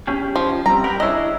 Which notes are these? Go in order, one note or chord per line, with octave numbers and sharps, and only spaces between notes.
C#4 G4 G#4
F3
G3 C4 A#5
B3 G4 A#4
C#4 D4 E4 G#4 D#5